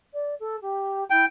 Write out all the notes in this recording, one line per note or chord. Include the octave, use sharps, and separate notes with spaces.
D5
A4
G4
E4 G5